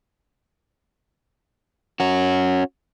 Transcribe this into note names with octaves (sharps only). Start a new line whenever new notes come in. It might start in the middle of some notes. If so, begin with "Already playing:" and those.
C#4 F#4